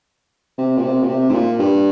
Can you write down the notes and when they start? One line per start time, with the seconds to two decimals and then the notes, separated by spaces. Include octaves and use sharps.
0.58 C3
0.78 A#2
0.83 C3
1.03 A#2
1.08 C3
1.30 G#2
1.34 A#2
1.59 G2